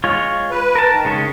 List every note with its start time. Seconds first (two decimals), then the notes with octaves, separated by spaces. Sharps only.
0.04 G#3 F4 C#5
0.51 B4
0.75 A#4 A5
0.90 D#3
1.05 C#3 G#3 C#4